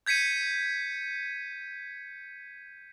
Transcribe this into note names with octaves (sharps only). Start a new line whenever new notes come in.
G6 G#6 B6 C#7 D#7